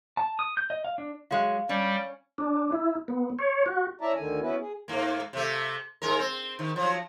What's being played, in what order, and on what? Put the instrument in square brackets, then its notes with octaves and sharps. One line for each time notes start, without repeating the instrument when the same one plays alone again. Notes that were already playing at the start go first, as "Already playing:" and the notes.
[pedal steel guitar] A5
D#6
G6
D#5
F5
D4
[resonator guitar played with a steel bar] F#3 G#3 [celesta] F5
[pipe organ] G3 [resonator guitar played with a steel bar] C#4
[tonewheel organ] D4
E4
B3
C#5
F#4
[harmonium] C#4 E4 D5 E5 A5 A#5
D2 D3 D#3 G#5
B3 C#4 E4 F#4 B4
G#4
[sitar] G#2 A#3
C3 A3
G#2 G#3 A#4
C4
D#3
F3 F#3